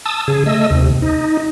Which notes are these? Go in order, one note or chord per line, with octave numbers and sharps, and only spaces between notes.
A5 D#6 E6
C#3 G#4
A3 D#5 E6
D#2 C3
D#4